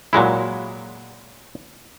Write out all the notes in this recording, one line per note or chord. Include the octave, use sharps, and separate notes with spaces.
A#2 F#3 G#3 E4